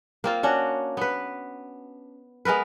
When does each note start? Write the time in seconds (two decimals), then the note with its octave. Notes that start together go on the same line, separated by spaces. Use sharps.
0.24 A#3 C4 F4
0.43 C#4 D4 F#4
0.97 B3 B4
2.45 G#3 B3 A#4 B4